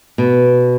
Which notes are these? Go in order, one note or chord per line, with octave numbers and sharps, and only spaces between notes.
B2